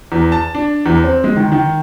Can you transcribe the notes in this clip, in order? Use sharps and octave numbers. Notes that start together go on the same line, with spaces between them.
E2
A5
D4
E2
C4
G#3
D#3
D#3